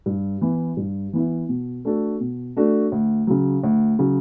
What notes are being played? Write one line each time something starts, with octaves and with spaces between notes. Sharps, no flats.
G2
E3 B3 E4
G2
E3 B3 E4
B2
A3 D4 F#4 A4
B2
A3 D4 F#4 A4
D2
C#3 F#3
D2
C#3 F#3